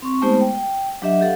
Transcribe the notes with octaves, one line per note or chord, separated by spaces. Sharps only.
C4 C#6
G#3 A3 B3 D#4 G4 C5
G5
G5
F#3 D4 G4 D#5 E5 F#5
G4 A4 F5 F#5